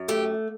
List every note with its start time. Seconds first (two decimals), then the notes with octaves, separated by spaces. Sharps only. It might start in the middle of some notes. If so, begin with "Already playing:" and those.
Already playing: F#2
0.08 A3 G4